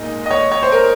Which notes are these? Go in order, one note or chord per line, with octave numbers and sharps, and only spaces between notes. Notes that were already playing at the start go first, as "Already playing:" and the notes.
Already playing: A#2 G#3 D#4 D#5
D#5
C#5
C#5
C5
A#4